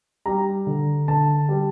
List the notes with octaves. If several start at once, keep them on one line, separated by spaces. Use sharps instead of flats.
G3 A#5
D3
D3 A5
G3